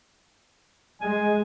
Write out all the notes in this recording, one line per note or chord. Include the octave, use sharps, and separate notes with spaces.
G#3 G#5